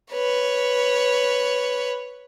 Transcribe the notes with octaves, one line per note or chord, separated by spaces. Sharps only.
B4 C#5